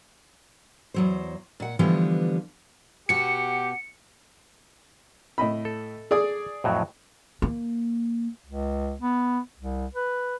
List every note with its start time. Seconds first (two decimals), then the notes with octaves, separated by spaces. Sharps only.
0.94 E2 F#3 C5
1.60 A#2 F#5
1.79 D3 E3 F3 G3 B3
3.09 B2 F#4 G4 C#7
5.38 A2 D#5 B5
5.65 A4
6.11 G#4 D5 D#6
6.64 F2 A2 F#3
7.42 A#3
8.46 C#2
9.01 B3
9.57 C2
9.94 B4